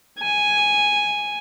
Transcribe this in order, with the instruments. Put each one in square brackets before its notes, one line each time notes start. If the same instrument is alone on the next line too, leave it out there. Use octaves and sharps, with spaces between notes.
[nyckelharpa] G#5